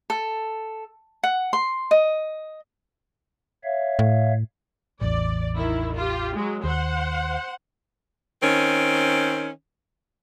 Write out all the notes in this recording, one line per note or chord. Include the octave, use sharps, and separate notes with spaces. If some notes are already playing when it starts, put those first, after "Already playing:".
A4
F#5
C6
D#5
C#5 E5 F5
A2
A1 E2 D5
D#3 E4
F4 G4
F#3 G#3
D#2 C5 F#5
D#3 C4 C#4